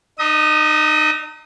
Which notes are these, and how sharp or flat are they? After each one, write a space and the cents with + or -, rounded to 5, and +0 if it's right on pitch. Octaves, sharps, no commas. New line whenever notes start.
D#4 -30 D#5 +40 D#6 +0